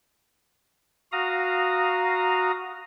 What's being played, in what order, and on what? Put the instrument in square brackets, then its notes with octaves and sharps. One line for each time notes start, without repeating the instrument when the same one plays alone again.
[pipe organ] F#4 F5 A#5 D#6